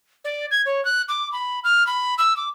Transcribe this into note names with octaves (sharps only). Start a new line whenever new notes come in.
D5
G#6
C#5
F#6
D6
B5
F6
B5
E6
D6